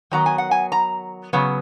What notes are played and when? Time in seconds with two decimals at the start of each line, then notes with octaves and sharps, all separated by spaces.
0.11 D#3 F#3 B3 A#5
0.26 G#5
0.38 F#5
0.51 G#5
0.72 A#5
1.33 C#3 F#3 B3